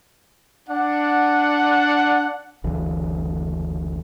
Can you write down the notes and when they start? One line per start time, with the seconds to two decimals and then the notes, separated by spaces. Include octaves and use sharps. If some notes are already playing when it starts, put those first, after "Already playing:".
0.69 D4 F#5
2.64 F#1 D2 E3